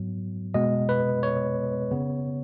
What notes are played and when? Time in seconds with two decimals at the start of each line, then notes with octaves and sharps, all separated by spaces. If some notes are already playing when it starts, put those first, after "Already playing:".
Already playing: G#2 F#3 B3
0.54 B2 G#3 B3 D#5
0.89 B4
1.23 C#5
1.91 C#3 B3